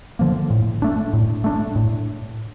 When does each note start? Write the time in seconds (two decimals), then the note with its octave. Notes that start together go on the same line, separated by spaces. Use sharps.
0.19 D3 F3 A#3
0.50 A2
0.82 A3 D4
1.13 A2
1.44 A3 D4
1.76 A2